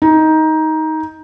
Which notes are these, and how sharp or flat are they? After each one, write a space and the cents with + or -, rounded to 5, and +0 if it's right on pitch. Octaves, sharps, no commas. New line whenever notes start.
D#4 +15